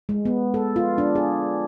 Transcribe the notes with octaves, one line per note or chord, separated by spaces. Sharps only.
G#3
B3
A4
F4
D4
G#4